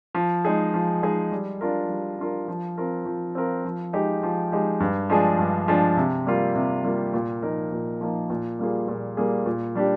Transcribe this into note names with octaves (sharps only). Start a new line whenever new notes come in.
F3
G#3 D#4 G#4
F3
G#3 D#4 G#4
G3
D4 F4 A#4
G3
D4 F4 A#4
F3
C4 F4 A#4
F3
C4 F4 A#4
F3
G#3 D#4 G4
F3
G#3 D#4 G4
G2
F3 G#3 D4 G#4
G2
F3 G#3 D4 G#4
C3
G3 A#3 F4
C3
G3 A#3 F4
A#2
F3 A#3 D#4 A#4
A#2
F3 A#3 D#4 A#4
A#2
G3 A#3 F4 G#4
A#2
G3 A#3 F4 G#4
A#2
G3 D4 G4